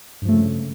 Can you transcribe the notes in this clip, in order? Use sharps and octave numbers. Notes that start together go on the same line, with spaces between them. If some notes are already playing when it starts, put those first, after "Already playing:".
G2 C#3 F3 A3